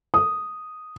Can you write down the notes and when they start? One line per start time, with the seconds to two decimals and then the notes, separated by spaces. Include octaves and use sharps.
0.14 D#6